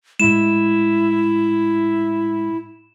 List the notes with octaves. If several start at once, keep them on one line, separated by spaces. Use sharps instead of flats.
A2 G#3 E4 E7